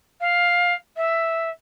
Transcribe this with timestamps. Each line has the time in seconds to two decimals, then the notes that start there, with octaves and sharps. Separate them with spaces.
0.20 F5
0.97 E5